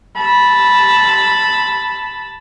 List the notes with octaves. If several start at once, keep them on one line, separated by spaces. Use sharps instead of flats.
A5 B5